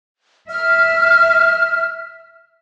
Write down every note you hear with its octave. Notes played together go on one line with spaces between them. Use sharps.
E5 F6